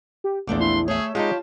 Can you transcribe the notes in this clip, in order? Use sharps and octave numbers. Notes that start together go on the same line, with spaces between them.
G4
A#1 E2 F3 A3 D4 D6
E4 C6
A3 G#4 C#5 E5
G#3 D#4 F4 G4 A5